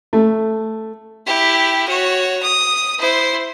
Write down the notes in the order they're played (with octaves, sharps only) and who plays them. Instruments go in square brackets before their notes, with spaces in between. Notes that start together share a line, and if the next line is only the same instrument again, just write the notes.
[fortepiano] A3
[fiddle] E4 G4
F#4 C#5
D#6
E4 C5